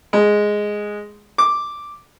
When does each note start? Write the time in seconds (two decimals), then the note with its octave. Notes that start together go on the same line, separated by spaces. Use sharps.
0.13 G#3
1.38 D6